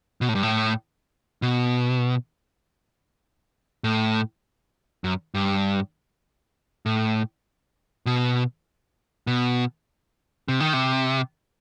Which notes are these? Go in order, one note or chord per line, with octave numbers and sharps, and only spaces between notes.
B2
A2
G2
A2
B2
A2
F#2
G2
A2
B2
B2
C3
D#3
C3